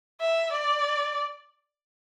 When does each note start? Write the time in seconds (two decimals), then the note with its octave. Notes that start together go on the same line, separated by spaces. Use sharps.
0.20 E5
0.52 D5